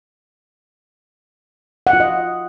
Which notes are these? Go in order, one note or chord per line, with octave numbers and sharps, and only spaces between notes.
F#5
F4
D#5